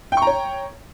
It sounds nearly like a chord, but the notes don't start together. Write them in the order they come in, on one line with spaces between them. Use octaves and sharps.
G5 C#6 A#5 C#5